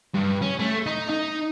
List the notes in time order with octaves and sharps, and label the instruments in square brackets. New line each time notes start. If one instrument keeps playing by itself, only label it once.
[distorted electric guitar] G2
C#4
A3
D#4
D#4